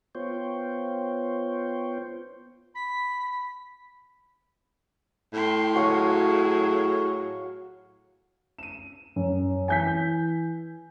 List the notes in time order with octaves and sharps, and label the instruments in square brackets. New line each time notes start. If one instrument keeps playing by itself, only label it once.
[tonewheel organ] B3 F4 C5 C#5 G5
[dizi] B5 [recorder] B6
[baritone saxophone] A2 [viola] G5 C6
[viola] F#3 G#4 [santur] F#4 C#5 F5
[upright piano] D#7 E7
F#2
[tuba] E3 [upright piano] G#5 G6 B6